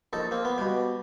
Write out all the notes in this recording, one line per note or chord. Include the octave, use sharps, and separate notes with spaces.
A#1 D#4 A4
A#3 C4
B3
B2 G3